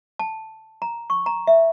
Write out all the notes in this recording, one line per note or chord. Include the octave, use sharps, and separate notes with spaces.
A5
A#5
C#6
A#5
E5